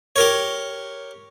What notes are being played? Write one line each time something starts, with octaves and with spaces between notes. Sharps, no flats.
G4 A#4 C#5